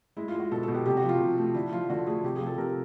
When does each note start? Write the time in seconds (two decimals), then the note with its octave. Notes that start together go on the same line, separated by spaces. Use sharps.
0.17 G#3 E4
0.28 F4
0.34 G#3
0.40 F#4
0.52 B2 A4
0.63 B2 A4
0.74 G4
0.85 C3 G4
0.97 F#4
1.03 F3
1.09 F4
1.20 C3
1.38 A3
1.54 D3 E4
1.72 F3 F4
1.90 D3 F#4
2.06 A3 G#4
2.24 C3 G4
2.36 F3 G#4
2.47 A4
2.58 C3 A#4